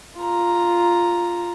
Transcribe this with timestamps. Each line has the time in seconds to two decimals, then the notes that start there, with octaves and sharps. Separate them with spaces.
0.18 F4 A#5